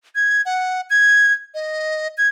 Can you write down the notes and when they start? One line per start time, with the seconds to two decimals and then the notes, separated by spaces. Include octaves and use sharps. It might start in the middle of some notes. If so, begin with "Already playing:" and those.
0.15 G#6
0.46 F#5
0.90 G#6
1.55 D#5
2.18 G#6